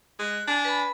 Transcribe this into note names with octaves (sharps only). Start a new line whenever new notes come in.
G#3 F#6
D4 G#5
B4 B5